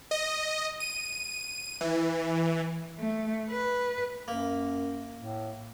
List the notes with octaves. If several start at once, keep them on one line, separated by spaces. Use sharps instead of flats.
D#5
D#7
E3
A3
B4
F#2 A#3
A2